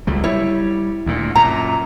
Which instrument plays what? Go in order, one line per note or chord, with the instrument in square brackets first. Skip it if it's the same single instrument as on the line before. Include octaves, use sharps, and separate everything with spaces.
[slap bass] C#2 F#3 G3
[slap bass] G3 [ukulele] E4 C#5
[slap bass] D2 A#2
[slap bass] F#2 A#2 [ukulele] A#5